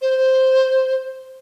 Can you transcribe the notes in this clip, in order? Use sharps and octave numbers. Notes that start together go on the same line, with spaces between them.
C5